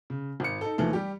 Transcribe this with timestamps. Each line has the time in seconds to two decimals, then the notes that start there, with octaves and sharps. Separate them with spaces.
0.10 C#3
0.40 G#1 C#7
0.61 D#4 A4
0.78 D#2 E3 F3 A3
0.93 G3 G4